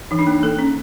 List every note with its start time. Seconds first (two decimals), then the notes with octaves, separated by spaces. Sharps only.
0.11 E3 D#4
0.19 D4
0.27 A#3 D#4
0.43 A#3 A4
0.59 C#4